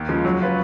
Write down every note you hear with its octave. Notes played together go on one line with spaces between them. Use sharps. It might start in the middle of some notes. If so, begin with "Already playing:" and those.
Already playing: D#2
C#3 F3 G#3
F#3
C#4 F4 B4